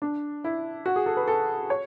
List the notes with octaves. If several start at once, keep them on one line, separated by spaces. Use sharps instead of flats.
D4
E4
F#4
G#4
A4
B4
A4
C#5